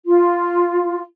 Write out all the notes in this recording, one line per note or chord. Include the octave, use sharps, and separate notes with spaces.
F4